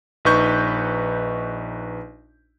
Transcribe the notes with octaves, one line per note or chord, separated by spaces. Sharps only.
A#1 D#4 B4 C#6 G6